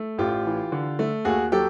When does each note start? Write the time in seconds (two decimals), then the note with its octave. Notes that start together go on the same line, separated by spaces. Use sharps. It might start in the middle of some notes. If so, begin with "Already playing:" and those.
Already playing: A3
0.18 A1 F4 G4
0.46 E3
0.72 D3
0.99 A3
1.25 D#2 F#4 G#4
1.52 F#3 G4 A4